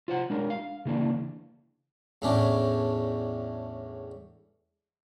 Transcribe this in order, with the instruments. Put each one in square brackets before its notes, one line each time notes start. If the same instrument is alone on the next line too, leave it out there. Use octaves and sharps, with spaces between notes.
[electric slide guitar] F4 C5 F#5
G#3 D4 A#4
F5
C#3 E3 A#3 D4
[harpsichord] E2 A2 C#4 D4